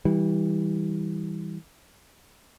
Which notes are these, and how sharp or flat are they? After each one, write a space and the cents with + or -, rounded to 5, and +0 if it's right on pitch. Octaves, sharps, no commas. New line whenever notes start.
E3 -25 G3 +0